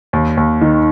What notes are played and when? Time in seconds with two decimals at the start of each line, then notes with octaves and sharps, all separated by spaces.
0.13 D#2
0.37 D#2
0.62 D#3